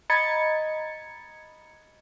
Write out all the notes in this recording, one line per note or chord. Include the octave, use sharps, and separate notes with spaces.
D#5 A#5 B5 G#6 A6 C#7